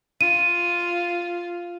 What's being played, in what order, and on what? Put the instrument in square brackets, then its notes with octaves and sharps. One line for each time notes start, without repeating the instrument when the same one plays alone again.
[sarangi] F4 [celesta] D#7